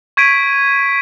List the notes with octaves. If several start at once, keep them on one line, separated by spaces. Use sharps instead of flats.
C#6 G#6 B6 D7 D#7